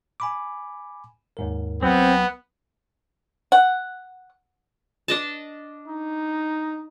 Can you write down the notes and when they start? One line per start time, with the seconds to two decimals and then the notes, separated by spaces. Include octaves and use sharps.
0.20 G#5 B5 D6
1.37 D#2 G#2 A#4
1.83 C2 F#3 B3 C4
3.52 F#5
5.08 D4 D#5 A5
5.88 D#4